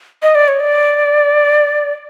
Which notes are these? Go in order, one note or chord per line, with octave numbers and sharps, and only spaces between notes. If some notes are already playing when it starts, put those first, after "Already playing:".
D#5
D5
C#5
D5